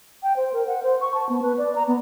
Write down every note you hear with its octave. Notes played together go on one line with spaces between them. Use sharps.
G5
C5
A#4
F#5
C5
C#6
A5
B3
B4
D5
A#5
B3